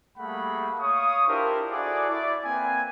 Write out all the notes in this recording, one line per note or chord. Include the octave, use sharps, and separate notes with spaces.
G3 A3 A#3 G#4 F#5 B5
C#5 F5 C#6 D#6
D4 E4 F4 G4 A#4 C5
E4 F#4 G#4 A4 D5
E4 D5
A#3 C4 B4 G#5